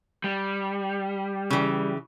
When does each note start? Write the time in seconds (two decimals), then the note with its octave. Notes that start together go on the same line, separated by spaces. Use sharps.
0.24 G3
1.50 C#3 E3